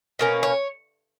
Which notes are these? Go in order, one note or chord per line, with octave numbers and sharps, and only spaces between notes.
B2 A#3 C#4
C#5